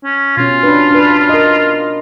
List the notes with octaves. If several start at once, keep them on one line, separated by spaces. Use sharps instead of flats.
C#4
B2 C#4 F4
D4 B4
D4 B4
A#4 D#5